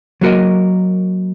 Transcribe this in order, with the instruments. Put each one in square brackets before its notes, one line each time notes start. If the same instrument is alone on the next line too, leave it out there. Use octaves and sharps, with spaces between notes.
[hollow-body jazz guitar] F#3 A#3 F#4 A#4 D#5